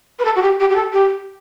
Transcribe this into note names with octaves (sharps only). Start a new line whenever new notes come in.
B4
A4
F#4
G4
G4
G4
A4
G4